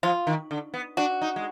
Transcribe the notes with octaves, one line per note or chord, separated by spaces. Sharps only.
F3 F4
D#3
D3
B3
D4 F#4
D#4
G#3